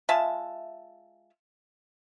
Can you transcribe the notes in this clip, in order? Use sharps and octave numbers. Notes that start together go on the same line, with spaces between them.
G#3 F4 E5 A5